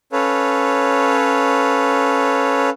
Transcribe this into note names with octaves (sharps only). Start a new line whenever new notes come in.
C#4 A4 B4 C#5 F5